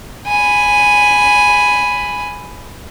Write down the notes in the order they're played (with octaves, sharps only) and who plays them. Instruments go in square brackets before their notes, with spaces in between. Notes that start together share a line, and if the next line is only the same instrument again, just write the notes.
[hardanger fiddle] G#5 B5